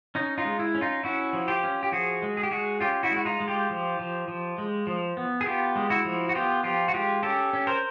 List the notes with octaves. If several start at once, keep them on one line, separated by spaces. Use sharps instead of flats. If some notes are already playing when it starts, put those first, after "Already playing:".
C#4 D#4
D#4 F4
G#3
E4
C#4
D#4 F4
C#4 E4 F#4
F3
F4 G4
C#4
G4
F3 F#4 G#4
G#3
G#4
G4
G#3 F#4 G#4
C#4 F4 G4
E4 F#4
G#3
F#4
D#4 F4
G#3
F4 G4
F3
F3
F3
G#3
F3
B3
G#4
B3 F4 G4
G#3
E4 F#4
F3
F#4
B3 F4 G4
F3 F4 G4
F#4
G#3 F4 G4
C#4 G4 A4
C#4
A#4 C5